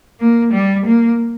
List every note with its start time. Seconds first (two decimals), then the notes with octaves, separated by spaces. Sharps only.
0.20 A#3
0.53 G3
0.86 A#3